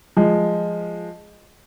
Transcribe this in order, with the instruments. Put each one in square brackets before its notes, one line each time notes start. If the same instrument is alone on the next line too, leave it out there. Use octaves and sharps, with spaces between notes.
[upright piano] F3 G#3